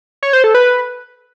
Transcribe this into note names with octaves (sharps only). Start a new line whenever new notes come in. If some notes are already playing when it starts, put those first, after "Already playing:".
C#5
C5
A4
B4